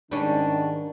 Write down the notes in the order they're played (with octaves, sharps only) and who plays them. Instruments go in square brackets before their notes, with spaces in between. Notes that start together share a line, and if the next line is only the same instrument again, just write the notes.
[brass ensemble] G#2 D#3 [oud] G3 C#4 [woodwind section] D4